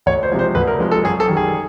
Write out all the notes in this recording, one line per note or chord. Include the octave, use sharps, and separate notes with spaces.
D2 C#5
C5
C3 F3 G#3
C5
D2 B4
A#4
C3 F3 G#3
A4
F#2 G#4
A4
D#3 G3
G#4